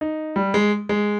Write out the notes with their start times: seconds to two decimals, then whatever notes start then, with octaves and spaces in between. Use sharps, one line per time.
0.01 D#4
0.36 G3
0.54 G#3
0.89 G#3